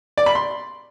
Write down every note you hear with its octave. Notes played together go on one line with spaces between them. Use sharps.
D5
B5
C6